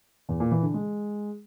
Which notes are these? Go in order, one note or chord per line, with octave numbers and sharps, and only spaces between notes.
E2
A#2
E3
D3
G#3